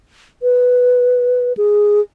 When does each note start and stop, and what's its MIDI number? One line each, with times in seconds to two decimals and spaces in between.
0.43 1.53 71
1.57 2.01 68